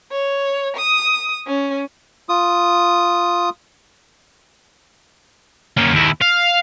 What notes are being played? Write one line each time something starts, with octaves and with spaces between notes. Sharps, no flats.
C#5
D#6
C#4
F4 D#6
A#3 C#4
D#2 E4
F5